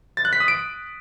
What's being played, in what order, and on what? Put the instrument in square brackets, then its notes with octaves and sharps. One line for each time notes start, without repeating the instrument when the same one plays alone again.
[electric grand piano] A6
F#6
B6
D#6
D7